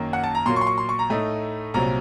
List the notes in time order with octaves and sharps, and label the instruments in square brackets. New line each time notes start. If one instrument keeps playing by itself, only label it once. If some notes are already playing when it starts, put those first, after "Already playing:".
Already playing: [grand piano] F#2 D#3 A#3
F#5
A5
A#5
A#2 F#3 A#3 C6
C#6
C6
C#6
C6
C#6
A#5
A2 A3 D#4
C2 A#2 F#3 C4 A#5